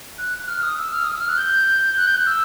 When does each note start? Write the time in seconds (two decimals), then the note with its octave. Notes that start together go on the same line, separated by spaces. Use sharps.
0.18 F#6
0.39 F#6
0.48 F6
0.63 D#6
0.78 E6
0.93 F6
1.04 D#6
1.12 E6
1.21 F6
1.29 F#6
1.37 G6
1.97 F#6
2.07 G6
2.16 F#6
2.27 E6